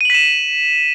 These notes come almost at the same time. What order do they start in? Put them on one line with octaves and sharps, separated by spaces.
D#7 F#7 B6 E7